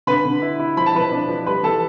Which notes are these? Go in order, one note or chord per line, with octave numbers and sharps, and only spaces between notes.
D3 B4 B5
D3
E4
E4
F3 B5
A5
F3 B4 B5
D4
F3
G3 B4 B5
E3 A4 A5